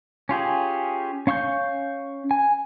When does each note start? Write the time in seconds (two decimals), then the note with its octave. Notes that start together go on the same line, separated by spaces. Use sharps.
0.29 C#4 F4 G4 G#4
1.27 C#4 F5 C#6 E6 G6
2.31 G#5